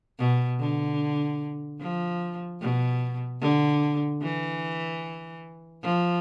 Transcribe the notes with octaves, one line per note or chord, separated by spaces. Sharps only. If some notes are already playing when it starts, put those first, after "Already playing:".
B2
D3
F3
B2
D3
E3
F3